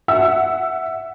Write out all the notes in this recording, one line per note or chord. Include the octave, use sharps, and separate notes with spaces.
E5 F#5 E6